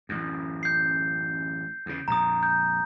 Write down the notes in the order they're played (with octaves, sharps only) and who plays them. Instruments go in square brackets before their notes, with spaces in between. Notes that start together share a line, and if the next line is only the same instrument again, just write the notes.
[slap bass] A1 F#2
[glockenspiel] G6 C7
[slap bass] E2 C#3
[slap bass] A#1 F2 [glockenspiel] A#5 D#6
[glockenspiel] G6